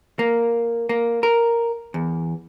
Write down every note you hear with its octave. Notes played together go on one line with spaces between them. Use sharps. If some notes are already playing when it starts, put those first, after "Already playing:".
A#3
A#3
A#4
E2